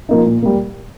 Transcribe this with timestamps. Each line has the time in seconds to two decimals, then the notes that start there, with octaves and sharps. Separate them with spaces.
0.09 F3 A#3 D#4
0.26 A#2
0.42 G3 A#3